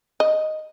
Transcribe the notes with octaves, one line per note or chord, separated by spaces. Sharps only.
D#5